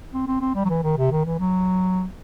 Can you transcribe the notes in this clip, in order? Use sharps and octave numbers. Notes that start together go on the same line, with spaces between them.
C4
C4
C4
G3
F#3
E3
D#3
C3
D#3
E3
F#3